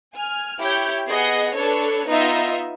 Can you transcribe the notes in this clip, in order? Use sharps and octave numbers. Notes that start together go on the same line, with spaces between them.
G#5 F6
E4 G4 C#5 G6
B3 G#4 D#5 F#5
D4 A4 B4 C#5
B3 D#4 F4 D#5 E5